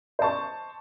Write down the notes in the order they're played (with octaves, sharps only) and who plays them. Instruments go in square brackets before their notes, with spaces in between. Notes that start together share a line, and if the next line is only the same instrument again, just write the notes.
[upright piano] C5 D#5 A5 C#6